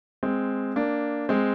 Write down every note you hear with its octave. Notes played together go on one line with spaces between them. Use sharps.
G#3 C4
A#3 D4
G#3 C4